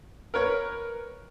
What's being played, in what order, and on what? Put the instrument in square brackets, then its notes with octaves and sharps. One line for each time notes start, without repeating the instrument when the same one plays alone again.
[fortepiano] A#4 B4 C#5